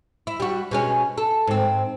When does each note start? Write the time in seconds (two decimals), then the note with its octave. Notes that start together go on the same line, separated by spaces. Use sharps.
0.27 E4
0.40 G3 F#4
0.71 B2 G#3 C#4
1.18 A4
1.47 G#2 C4